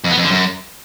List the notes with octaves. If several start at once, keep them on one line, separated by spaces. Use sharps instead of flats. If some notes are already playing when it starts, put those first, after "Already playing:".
F2
B3
F2
D3
F#2